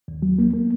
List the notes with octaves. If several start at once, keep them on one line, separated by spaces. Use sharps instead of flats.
D#2
F#3
A#3
A#3